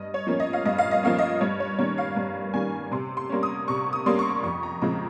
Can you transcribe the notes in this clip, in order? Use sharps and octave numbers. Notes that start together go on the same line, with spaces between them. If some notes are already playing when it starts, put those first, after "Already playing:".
Already playing: G2 D#5
C#5
F3 A#3 C#4
D#5
F5
G2 D#5
F5
D#5
F3 A#3 C#4 F5
D#5
G2 C#5
C#5
D#3 G3 A#3 C#4 C#5
F5
G2
D#3 G3 A#3 C#4 G#5
C3 C6
C6
G3 A#3 C#4
D#6
C3 C#6
D#6
G3 A#3 C#4 C6
C#6
F2 C#6
A#5
C#3 F3 G#3 C4 A#5